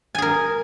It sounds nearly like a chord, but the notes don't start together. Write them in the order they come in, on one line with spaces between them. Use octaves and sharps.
G#5 G#4 A#4